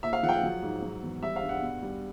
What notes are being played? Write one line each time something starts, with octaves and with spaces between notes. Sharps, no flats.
A#2 E5
F5
F3 F#5
G5
F#5
F#3
G#2
F#3
E2
G3 E5
F5
G2
F#5
B2
G3